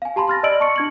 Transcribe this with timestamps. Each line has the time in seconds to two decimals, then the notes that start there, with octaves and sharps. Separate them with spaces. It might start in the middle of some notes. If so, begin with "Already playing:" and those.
0.02 F5 G#5
0.16 G4 A5 B5 C6
0.28 C6 F6 A6 A#6
0.43 D5 D#5 E6 F6 D7 F#7
0.60 A5 C#6 C#7
0.76 D4 G#6 F#7